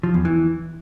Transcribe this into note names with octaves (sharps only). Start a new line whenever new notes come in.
F3
E2
E3